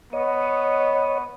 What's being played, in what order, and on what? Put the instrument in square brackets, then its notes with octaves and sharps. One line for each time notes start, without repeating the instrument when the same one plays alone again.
[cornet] B3 [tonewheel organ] C#5 D#5